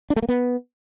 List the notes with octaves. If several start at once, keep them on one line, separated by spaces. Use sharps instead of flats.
D4
A3
A#3
B3